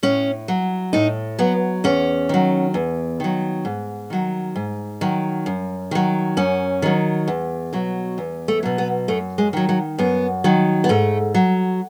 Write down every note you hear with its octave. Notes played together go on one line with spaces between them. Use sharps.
A2 C#4
F#3
A2 D#4
F#3 B3
E2 C#4
D#3 F#3
E2
D#3 F#3
G#2
D#3 F#3
G#2
D#3 F#3
F#2
D#3 F#3
F#2 C#4
D#3 F#3
E2
B2 F#3
E2
A3
B2 F#3
B3
F#2 A3
G#3
D#3 F#3
F#3
F#2 B3
D#3 F#3
B3
G#2 A3
F#3